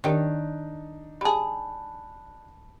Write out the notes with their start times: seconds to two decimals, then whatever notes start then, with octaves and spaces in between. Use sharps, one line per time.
0.04 D#3 G3 D4 D#4 C#5
1.21 G3 G#4 A5 B5